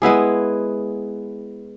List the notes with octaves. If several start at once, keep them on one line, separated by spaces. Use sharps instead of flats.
G#3 B3 E4 G#4